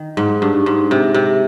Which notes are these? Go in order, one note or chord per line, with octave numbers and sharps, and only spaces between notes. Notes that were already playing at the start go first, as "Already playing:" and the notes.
Already playing: D#3
G#2
G2
G#2
C3
C3